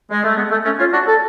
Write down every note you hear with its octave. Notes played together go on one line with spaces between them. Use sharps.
G#3
A3
G#3 B3
A3
A3 C#4
C#4 F4
D4 F#4
A4